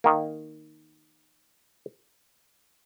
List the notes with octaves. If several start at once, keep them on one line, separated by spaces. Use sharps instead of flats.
D#3 A#3